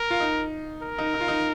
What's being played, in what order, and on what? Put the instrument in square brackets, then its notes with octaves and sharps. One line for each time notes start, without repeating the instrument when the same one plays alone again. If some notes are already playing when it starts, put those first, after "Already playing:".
Already playing: [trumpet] A#4
[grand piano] F4
D#4
[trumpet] A#4
[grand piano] D#4
D#4
F4
D#4